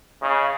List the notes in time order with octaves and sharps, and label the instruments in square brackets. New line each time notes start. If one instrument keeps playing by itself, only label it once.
[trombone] C#3 [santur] D#5